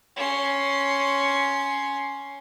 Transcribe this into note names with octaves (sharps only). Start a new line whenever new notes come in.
C#4 C6